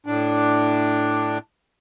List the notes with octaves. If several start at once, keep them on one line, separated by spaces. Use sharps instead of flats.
A2 D4